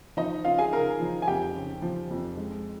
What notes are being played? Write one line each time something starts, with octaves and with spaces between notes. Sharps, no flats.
F3 D#4 D#5
C#3 F4 F5
G#4 G#5
C#3 A#4 A#5
F3
G#5
F2 G4 G5
C#3
F3
F2
G#3